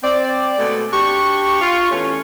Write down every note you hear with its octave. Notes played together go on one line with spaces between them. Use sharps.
C4 D5
B2 G#3 A3
D4 F#4 G4 C#6
F4
E2 A3 C#4